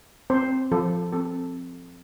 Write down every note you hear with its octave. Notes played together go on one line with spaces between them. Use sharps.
C4 C5
F3 A4
C4 A4